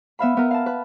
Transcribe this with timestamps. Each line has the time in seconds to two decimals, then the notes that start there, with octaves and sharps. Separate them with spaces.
0.19 B3 E5 F5 B5
0.37 B3 A#4
0.51 F5 A5
0.66 B4